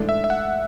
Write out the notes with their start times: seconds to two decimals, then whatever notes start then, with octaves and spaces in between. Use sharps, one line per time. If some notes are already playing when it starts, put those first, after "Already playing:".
Already playing: G#2 E3 A3 D4
0.09 E5
0.24 E5
0.30 F#5